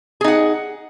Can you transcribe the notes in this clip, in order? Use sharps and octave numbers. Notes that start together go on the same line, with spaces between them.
D#4 G#4 F#5